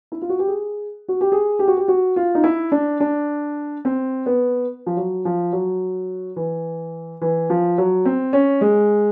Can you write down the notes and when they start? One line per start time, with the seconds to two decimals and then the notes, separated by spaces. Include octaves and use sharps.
0.12 E4
0.22 F4
0.29 F#4
0.39 G4
0.47 G#4
1.08 F#4
1.21 G4
1.32 G#4
1.59 G4
1.68 F#4
1.77 G4
1.88 F#4
2.16 F4
2.35 D#4
2.44 E4
2.72 D4
3.00 D4
3.85 C4
4.26 B3
4.86 F3
4.97 F#3
5.25 F3
5.53 F#3
6.36 E3
7.21 E3
7.50 F3
7.78 F#3
8.05 C4
8.33 C#4
8.61 G#3